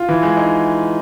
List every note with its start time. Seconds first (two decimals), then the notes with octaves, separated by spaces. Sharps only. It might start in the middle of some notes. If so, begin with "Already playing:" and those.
Already playing: F4
0.09 E3
0.23 G#3
0.37 D#4